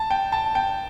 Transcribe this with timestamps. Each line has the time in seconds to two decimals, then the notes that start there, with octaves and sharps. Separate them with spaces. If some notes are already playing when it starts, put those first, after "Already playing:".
Already playing: A5
0.10 G5
0.32 A5
0.55 G5